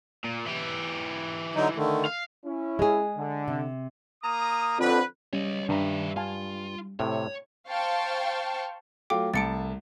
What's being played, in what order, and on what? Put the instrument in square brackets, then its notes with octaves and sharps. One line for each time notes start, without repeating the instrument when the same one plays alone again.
[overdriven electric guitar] A#2
E3 G4
[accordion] D3 F#3 D#4
D3 D#3 A3
[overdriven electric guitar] F5
[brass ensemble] C#4 E4
[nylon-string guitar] G#3 G#4
[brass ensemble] D3
[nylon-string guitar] C3
[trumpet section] A#3 A#5 D#6
[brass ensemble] F2 D3 [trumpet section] B4
[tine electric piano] G3 [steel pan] C#4 [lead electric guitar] C#5 D#5
[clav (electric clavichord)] G2 [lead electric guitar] D#3 E5 [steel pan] D4 A#5
[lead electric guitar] F4 [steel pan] F5 G#5 A5
[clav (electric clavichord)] A2 C3 [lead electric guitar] C#5
[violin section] C5 F5 G5 A5 C#6
[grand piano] F#3 A3 F4 [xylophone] G5 D6
[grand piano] C2 A3 A5 [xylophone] A6 C#7 D7